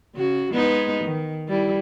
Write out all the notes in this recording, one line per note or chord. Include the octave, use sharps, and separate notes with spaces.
C#3 F#4
G#3 B3 D#4
D#3
G3 E4